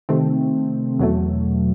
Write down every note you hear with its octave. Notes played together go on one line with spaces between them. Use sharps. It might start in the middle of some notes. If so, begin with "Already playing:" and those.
C3 D#3 A3 C4
E2 B2 F#3 A3